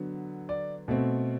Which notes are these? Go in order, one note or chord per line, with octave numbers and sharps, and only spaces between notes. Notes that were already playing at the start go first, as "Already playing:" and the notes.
Already playing: D3 F#3 B3
D5
B2 A3 C4